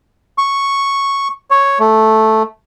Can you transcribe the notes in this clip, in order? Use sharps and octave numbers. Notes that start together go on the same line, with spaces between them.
C#6
C#5
A3